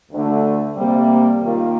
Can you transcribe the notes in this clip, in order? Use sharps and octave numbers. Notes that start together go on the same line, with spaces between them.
D2 D3 A3
C3 G3 A#3
D#2 D#3 A#3 F4